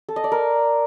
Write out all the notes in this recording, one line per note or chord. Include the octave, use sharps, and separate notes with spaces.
A4
D#5
D5
A#4